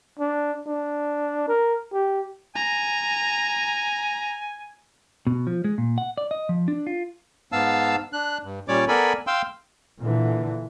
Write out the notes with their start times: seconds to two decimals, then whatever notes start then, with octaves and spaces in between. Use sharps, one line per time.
0.19 D4
0.67 D4
1.48 A#4
1.93 G4
2.55 G#5 A#5
5.27 B2
5.47 F3
5.64 G#3
5.78 A#2
5.98 F#5
6.17 D5
6.31 D#5
6.49 F3
6.68 D4
6.87 F4
7.52 G#2 B3 F5 A5 E6
8.13 D4 F#6
8.44 G2
8.68 A#2 G3 C#4 C#5 D5 D6
8.88 B3 A4 A#4 D5 G#5 B5
9.27 F5 G5 C6 E6
10.00 A#2 D3 E3